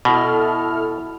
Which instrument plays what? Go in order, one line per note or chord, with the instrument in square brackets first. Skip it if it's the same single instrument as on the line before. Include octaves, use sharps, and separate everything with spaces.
[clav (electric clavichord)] B2 [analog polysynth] E4 A4 F6